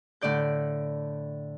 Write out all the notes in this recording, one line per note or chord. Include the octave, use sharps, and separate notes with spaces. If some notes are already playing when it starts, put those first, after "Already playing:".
A2 D3 D5 G6